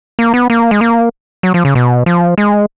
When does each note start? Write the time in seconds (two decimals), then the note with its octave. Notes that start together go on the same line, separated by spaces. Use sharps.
0.19 A#3
0.34 B3
0.50 A#3
0.71 G#3
0.81 A#3
1.43 F#3
1.54 F3
1.65 C#3
1.75 B2
2.06 F3
2.38 G#3